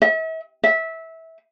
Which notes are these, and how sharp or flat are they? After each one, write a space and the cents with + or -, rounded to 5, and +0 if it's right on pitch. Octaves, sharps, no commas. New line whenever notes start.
E5 -40
E5 -20